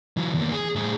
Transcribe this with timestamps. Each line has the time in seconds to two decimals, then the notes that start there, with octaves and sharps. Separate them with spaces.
0.17 E3 F#3
0.34 E2 A#3
0.52 G#4
0.76 A2 G#4